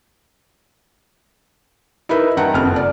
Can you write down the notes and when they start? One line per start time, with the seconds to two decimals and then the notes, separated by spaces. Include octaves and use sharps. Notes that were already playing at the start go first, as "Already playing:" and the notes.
2.09 D#4 E4 A#4 B4 E5
2.37 G2 D#3 F#5 G5 A#5 F#6
2.54 F#1 F2 F6
2.76 D5